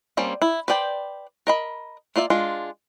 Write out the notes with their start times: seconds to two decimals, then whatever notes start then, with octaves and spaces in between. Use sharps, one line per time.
0.17 G3 A#3 C4 C#4
0.42 E4
0.68 B4 C5 D5 G5
1.47 A#4 D#5 B5
2.16 A#3 F4 D5 E5
2.30 G#3 D4 F4